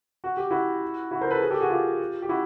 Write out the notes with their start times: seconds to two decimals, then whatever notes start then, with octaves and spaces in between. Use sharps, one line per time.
0.24 F#4
0.37 G4
0.50 E4 F#4
1.11 E4 F#4
1.21 A#4 C5
1.31 A4 B4
1.41 G#4 A#4
1.50 G4 A4
1.60 F#4 G#4
1.70 F4 G4
2.22 G4
2.29 E4 F#4